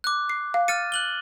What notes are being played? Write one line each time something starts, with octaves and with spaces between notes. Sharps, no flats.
D6 F#6
C7
F5
F6 A6 C#7 D#7
F#6 F#7 G7